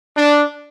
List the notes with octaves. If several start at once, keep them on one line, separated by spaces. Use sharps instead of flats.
D4